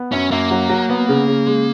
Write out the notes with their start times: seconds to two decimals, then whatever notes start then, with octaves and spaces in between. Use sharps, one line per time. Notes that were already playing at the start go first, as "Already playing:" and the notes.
Already playing: B3
0.12 F#2 C#4
0.31 F#2 A#3
0.51 F#3
0.69 F#3
0.89 B3
1.09 C#3
1.28 C#3
1.47 G#3